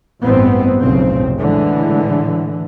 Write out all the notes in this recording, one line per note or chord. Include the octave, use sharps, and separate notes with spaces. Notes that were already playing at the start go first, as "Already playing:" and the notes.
A1 G2 G#3 B3 C4
F1 B1 A2 C#3 C4
A2 D3 E3 G#3